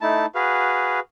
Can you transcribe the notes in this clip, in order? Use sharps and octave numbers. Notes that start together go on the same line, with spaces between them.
A3 D#4 E4 A5
F#4 G#4 B4 F5